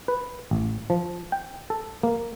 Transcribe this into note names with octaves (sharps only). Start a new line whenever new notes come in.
B4
A1
F3
G5
A4
A#3